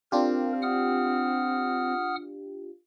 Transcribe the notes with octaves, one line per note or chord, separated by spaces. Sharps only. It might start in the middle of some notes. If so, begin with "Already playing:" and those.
C4 D4 F4 G4 A#4
F#5 D#6 F6